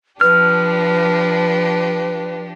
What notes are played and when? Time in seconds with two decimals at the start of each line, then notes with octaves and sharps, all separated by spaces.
0.21 F3 D4 G4 B4 F6